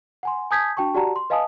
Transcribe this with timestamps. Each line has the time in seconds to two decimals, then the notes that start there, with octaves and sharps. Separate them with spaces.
0.23 F#5 G#5 C6
0.51 G#5 A5 D#6 G6 G#6 B6
0.77 D4 F#4 G5 A5 C#6
0.95 F#4 G4 D5 F#5 A5 A#5
1.16 C6
1.30 B4 D#5 F5 G#5 A5 D#6